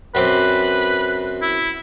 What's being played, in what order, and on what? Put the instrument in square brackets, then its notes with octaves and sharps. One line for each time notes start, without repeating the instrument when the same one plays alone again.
[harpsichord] F#2 C4 D6 [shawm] B4
[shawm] E4